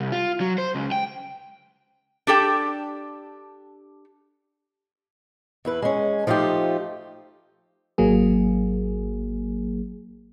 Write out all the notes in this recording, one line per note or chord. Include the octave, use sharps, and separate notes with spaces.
C2
F4
F#3
C5
C#2
G5
D4 G4 A4 G5
E2 E4 B4
G#3 C#4
F3 A3 D#4 F4 G4
G#1 F#3 A#3 G#4